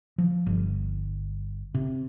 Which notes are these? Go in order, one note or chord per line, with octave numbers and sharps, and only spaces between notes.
F3
G1
C3